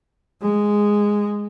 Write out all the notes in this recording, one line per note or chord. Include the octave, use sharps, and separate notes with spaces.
G#3